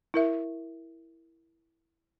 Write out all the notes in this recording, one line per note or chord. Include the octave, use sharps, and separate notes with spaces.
E4 A#4 E5